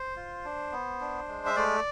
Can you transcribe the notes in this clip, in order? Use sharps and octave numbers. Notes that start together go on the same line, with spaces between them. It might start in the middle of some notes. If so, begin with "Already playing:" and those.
Already playing: C5
F4
D4
B3
D4
G#3
E5
A3 D5